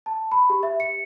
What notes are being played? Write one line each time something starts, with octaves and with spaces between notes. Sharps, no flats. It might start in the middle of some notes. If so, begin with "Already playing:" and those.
A5
B5
G4
E5
C#7